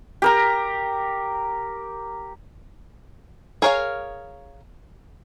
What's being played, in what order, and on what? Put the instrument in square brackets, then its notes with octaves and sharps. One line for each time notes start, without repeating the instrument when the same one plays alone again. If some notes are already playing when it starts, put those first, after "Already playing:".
[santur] G4 A#4 A#5
[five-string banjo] G#4 A#4 C#5 D#5 F5